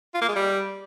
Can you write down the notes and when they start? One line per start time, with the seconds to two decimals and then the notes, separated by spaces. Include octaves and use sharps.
0.14 F4
0.21 A#3
0.28 G#3
0.35 G3